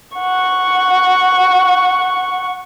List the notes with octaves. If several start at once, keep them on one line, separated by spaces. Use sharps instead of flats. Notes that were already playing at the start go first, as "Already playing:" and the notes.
F#5 C#6